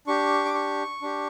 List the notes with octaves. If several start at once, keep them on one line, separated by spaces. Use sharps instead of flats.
D4 G4 C#6
D6
C#6
D4 G4